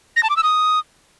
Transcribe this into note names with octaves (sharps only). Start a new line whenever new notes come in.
A#6
A5
D6
E6
D#6